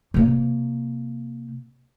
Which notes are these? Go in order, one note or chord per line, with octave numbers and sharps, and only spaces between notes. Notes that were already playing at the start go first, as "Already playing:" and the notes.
C3 A#3